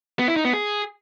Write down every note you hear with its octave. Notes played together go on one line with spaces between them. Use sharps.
B3
E4
D#4
B3
G#4